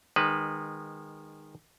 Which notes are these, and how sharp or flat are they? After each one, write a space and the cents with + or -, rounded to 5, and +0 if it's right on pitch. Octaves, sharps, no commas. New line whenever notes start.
D#3 -10 G#3 -25 B4 +0